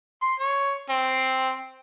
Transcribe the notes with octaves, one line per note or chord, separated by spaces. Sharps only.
C6
C#5
C4